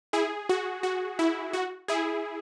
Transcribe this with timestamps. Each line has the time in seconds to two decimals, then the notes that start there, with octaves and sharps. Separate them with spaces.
0.13 E4 G#4
0.49 F#4
0.83 F#4
1.19 E4
1.53 F#4
1.88 E4 G#4